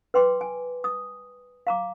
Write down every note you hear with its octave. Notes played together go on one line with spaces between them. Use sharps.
B4 G5 C6 D6
G#5
D#6
F5 A#5 D6